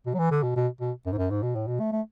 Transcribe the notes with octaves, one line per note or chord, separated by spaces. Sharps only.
B2
F#3
E3
D3
B2
B2
B2
F#2
G#2
F#2
G#2
B2
A2
B2
A3
A3